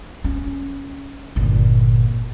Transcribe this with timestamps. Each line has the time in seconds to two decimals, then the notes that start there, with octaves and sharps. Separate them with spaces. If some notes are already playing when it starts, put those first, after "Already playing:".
0.24 C#4
1.36 G1 A#2